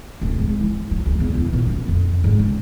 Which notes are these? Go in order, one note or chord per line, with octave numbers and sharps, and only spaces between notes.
D1
G#2
E3
F#3
C#2
E2
E2
A#2
C#4
F2
G#2
C#3